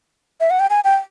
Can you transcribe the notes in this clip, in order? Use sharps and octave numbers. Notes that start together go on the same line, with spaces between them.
E5
F#5
G5
G#5
G5